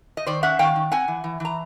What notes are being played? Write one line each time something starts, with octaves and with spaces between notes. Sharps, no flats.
D#5
D#3 C5 D5
C#4 E5 F#5
D#3 F5 G5
D#3
C4 F#5 G#5
E3
E3
E3 A#5